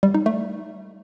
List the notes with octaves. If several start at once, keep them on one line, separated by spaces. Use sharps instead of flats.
G3
D#4
A3